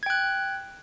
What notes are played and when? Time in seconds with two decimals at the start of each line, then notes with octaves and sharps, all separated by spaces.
0.03 G#6
0.06 G5
0.10 F#6